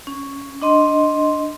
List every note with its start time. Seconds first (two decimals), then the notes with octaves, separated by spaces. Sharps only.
0.07 C#4
0.62 D4 D#5 C6